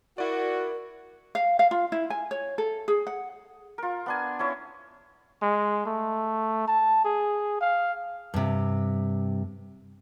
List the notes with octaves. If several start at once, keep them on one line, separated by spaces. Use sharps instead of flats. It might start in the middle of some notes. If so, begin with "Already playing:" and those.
E4 F#4 A#4 D5
F5
F5
F4
E4
G#5
C#5
A4
G#4
F#5
F4 A#4
B3 D4 G#5
C#4 E4 C#5
G#3
A3
A5
G#4
F5
G2 C3